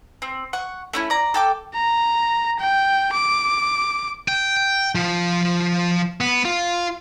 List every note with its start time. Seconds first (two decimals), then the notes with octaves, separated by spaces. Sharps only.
0.22 C4
0.53 F#5 C#6
0.93 A3 C#4 E4
1.10 D5 A#5
1.34 A4 G5 D6
1.74 A#5
2.59 G5
3.13 D6
4.28 G5
4.57 G5
4.95 F3
6.21 B3
6.45 F4